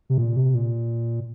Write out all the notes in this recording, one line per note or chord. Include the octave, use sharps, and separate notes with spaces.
C3
A#2
C3
A#2